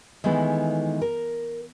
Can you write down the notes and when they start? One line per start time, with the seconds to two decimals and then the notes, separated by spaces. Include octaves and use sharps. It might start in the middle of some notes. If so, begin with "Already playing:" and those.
0.24 D#3 E3 G#3 A3 B3 E4
1.02 A#4